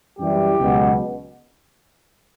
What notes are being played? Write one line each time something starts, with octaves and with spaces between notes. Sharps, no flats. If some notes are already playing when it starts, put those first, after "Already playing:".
F#2 E3 G3 G4
C#2 B2 F#3